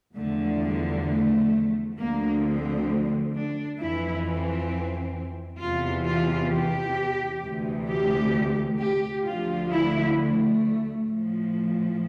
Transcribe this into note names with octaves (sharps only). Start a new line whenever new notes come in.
E2 D3 F3 A3
G3
A3
D2 D3 F3 A#3
C4
D4
F2 E3 E4
C4
E2 C3 E3 F4
F4
G4
D2 C3 E3
G4
G4
D2 D3 F3 F4
E4
A3
A2 F3